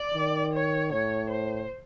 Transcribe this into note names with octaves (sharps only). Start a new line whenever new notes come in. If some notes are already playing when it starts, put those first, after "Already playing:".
Already playing: D5
D#3
C#5
A2 C#5
C5